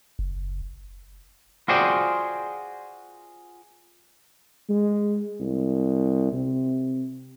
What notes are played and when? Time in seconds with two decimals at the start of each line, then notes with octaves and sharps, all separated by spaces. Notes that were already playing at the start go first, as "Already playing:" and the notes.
0.19 F#1
1.68 F4 F#4 G#4 C5 D5 G5
4.69 G#3
5.40 C2
6.33 C3